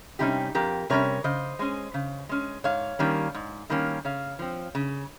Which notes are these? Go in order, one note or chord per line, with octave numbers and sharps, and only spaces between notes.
C3 G3 C#4 D#4 G4
F2 G4 A#4
C3 G3 C#4 A#4 C#5
C#3 C5 D#5
G#3 C#4
C#3
G#3 C#4
G#2 C#5 F5
D#3 G3 A#3 C#4
G#2
D#3 G3 A#3 C#4
C#3 C#5 F5
F3 C4
C#3